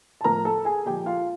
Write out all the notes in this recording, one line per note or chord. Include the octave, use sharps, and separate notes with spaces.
A5
A2 F3 A#3 A#4 A#5
A4 A5
G#4 G#5
A#2 F3 G#3 G4 G5
F4 F5